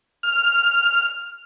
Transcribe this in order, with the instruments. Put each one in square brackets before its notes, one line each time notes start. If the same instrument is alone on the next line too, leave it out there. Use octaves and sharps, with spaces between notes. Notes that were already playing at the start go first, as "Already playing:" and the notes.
[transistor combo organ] F6